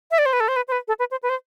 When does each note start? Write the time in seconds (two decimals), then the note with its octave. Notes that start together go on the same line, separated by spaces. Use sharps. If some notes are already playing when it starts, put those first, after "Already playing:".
0.11 E5
0.18 D5
0.26 C5
0.33 B4
0.40 A4
0.48 C5
0.56 B4
0.68 C5
0.72 B4
0.88 A4
0.99 B4
1.11 C5
1.23 B4
1.29 C5